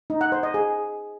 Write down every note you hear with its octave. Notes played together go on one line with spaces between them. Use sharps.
D#4
F#5
C5
D#5
G#4